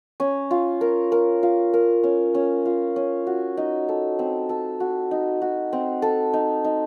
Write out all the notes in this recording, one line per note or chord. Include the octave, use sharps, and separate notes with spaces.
C#4
F4
A#4
A#4
F4
A#4
C#4
C#4
F4
C#4
F#4
D#4
A4
C4
A4
F#4
D#4
F#4
C4
A4
D#4
D#4